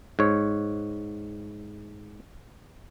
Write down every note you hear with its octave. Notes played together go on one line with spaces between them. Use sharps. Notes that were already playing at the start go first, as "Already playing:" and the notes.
G#2 C#5